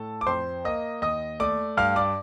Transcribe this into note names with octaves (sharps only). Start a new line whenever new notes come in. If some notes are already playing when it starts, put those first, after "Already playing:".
Already playing: A2 A4 A5
D6
F2 C5 C6
A#3 D#5 D#6
D#2 D#5 D#6
A3 D5 D6
G2 F5 F6
D5 D6